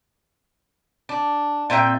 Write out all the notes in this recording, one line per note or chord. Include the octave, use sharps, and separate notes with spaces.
D4
A#2 C4 E5 G5